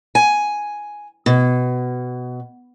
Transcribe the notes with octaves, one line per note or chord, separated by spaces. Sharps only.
G#5
B2